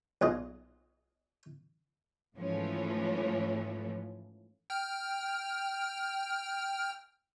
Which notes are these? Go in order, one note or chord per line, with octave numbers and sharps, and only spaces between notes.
B1 A#2 G#4 D#5
G#2 E3 F3 A3 C#4
G5 F6